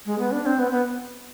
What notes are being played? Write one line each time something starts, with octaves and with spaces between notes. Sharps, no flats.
G#3
B3
D4
C4
B3
B3